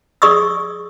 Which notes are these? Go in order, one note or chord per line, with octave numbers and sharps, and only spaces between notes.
G#4 D5 C#6 D#6 E6